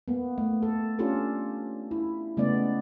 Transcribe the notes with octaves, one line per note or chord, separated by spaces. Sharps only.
A#3 B3
A3
A4
C#4 D4 F4 G4 A4
E4
C#3 G#3 A3 B3 D5